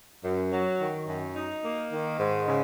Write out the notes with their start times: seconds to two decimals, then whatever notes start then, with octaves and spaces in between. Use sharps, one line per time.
0.23 F#2
0.52 F#3
0.80 D#3
1.08 F#2
1.36 D#4
1.64 A#3
1.91 D#3
2.19 G#2
2.47 C#3